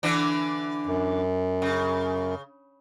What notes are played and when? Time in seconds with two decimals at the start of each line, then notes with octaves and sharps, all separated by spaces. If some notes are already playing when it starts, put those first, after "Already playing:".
0.03 D3 E3 D4
0.87 F#2
1.62 C#3